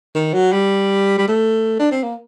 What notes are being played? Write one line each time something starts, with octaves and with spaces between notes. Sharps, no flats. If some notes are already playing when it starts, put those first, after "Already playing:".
D#3
F#3
G3
G3
A3
D4
C4
A#3